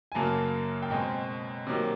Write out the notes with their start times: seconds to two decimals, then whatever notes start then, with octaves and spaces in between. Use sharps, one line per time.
0.12 G#5
0.15 F#2 C#3 F#3 A#3 A5
0.82 G5
0.90 B2 G#3 C4 G#5
1.67 C3 D#3 F#3 A#3